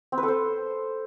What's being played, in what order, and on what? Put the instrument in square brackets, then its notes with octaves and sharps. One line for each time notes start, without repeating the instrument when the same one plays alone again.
[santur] C4
B4
A4
C5